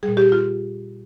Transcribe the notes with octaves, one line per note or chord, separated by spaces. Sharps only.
G3 G#4
A#2
G4
F4